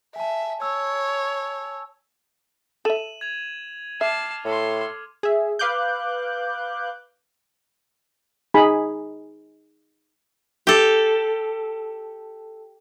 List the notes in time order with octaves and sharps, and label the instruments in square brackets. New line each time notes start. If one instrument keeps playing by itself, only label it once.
[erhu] E5 [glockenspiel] G#5 A5
[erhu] C#5 [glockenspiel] E6
[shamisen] A4 E5 [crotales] D#7 E7 F#7
[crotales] G#6 F7
[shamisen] E5 [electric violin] A5 C7 [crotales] D6 F6
[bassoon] A2 [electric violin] A4 C6
[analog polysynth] G#4 E5
B4 F5 D6 F#6 G6
[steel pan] D#4 G#4 G#5 B5
[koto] G4 A4